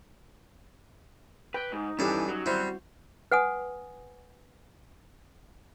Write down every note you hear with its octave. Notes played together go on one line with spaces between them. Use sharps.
B4 G5
G#2 D#4
G2 E3 C#4 G4 A4
F#3 D#4
G3 C4 E4 F#4 C5
B4 F#5 G#5 D#6